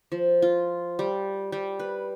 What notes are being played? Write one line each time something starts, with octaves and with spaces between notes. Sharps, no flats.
F3
F4
G3
G3
B4